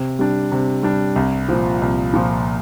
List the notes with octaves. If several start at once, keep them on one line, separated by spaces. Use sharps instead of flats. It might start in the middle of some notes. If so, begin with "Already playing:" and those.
Already playing: C3
G3 D4
C3
G3 D4
C2
A#2 F3
C2
A#2 F3